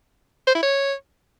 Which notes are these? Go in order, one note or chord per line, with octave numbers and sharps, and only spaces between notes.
C5
E4
C#5